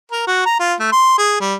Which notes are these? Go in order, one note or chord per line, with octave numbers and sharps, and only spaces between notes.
A#4
F#4
A#5
F4
A3
C6
G#4
G3